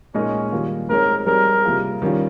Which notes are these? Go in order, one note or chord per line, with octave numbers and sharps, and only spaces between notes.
A#2 G#3 C#4 D#4 A#4 D#5
D#3 G3 A#3 F4 A#4
G#3 C4 D#4 G#4 A#4 C#5
G3 C4 D#4 G#4 A#4 C#5
C3 G3 A#3 F4 G#4
D#3 G3 C#4 F4